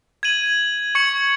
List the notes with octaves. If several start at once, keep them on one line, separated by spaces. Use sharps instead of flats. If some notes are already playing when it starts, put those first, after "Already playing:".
G#6 D#7 F#7
C#6 G#6 C#7 F#7